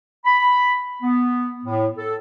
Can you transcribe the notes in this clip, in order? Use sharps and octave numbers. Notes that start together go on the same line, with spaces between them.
B5
B3
A2
A4